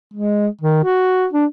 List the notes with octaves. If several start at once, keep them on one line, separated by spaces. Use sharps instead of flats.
G#3
D#3
F#4
D4